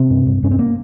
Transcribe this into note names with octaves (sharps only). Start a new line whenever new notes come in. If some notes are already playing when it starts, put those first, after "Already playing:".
Already playing: C3 C4
G2
G2
G2 C#4
C4
A#3